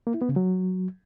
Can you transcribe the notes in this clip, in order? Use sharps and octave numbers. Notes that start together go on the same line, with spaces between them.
A#3
E4
B3
C#3
F#3